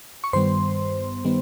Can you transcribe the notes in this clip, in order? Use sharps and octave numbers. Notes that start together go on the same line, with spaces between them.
C#6
G2 D#3 G3 B3 C5 C6
D#3 G3 B3